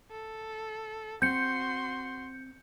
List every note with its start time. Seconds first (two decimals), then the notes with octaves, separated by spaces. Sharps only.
0.11 A4
1.22 C4 F#4 C6 G6 C#7